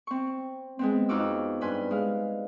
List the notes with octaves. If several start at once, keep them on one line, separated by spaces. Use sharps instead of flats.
C4 C#6
G#3 B3 C4
F2 D#4 F4 F#4 D6 E6
G2 B4 G#5 C6
G#3 F5